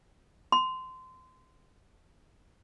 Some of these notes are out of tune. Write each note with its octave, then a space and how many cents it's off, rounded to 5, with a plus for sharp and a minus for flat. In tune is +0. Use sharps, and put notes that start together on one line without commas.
C6 -25